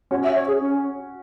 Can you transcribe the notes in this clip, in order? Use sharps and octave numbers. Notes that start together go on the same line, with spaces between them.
C#4 F#4 C#5
E5
C#5
G#4
C#4